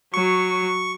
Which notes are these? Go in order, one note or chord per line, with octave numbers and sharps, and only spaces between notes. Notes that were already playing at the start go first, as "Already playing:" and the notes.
F#3 C#6